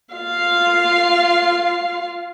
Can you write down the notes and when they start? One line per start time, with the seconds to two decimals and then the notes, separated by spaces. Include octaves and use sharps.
0.15 F4 F5